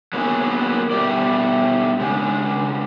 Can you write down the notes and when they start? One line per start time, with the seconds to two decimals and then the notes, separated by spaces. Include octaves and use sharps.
0.13 F#3 A#3 B3 G#4 C#5
0.91 B2 G3 A3 D5
2.00 C#3 G#3 D4